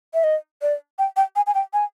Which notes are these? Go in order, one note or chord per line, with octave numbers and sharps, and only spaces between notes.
E5
D#5
D5
G5
G5
G#5
G#5
G5
G#5